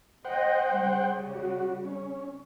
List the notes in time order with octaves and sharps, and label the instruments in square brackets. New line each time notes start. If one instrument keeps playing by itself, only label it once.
[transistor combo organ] C5 F#5 G5 [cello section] D#5
[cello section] C#3 G3
[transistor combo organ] F#4
C#4